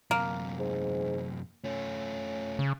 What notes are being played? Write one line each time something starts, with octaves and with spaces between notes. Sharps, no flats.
F#2 C3 A#3
G#2
A3 C#4 F4
C#3